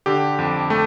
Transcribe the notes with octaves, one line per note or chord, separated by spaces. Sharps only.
D3 G4
F2
A3